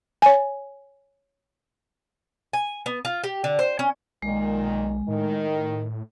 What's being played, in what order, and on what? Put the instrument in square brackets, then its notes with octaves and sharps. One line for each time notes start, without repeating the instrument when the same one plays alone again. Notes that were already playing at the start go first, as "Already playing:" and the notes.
[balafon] C#5 G#5
[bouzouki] G#5
B3
F4
G4
D3
C5
C#4
[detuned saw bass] B1 [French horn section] A#2 D#3 [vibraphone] G#3
[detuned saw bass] A2 [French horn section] D#3